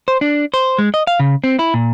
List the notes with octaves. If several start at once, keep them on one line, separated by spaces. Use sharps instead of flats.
C5
D4
C5
G#3
D#5
F5
C#3
C4
E4
A#2